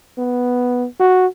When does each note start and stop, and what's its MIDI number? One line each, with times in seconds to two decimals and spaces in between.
0.18 0.86 59
0.99 1.27 66